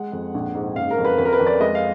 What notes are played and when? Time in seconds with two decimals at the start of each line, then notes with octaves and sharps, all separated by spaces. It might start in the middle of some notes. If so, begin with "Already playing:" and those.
Already playing: G#3 F#5
0.12 F2
0.34 A#1
0.55 G#2
0.76 F#1 F5
0.91 A#4
0.98 F2
1.05 B4
1.18 F2 B4
1.25 A#4
1.33 B4
1.40 F2
1.47 D5
1.60 G#3 D#5
1.75 F5